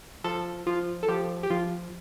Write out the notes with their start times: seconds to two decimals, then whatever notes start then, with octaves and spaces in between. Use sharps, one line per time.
0.24 F3 A4
0.67 F3 F4
1.03 A4
1.08 F3 G4
1.43 G4
1.50 F3 F4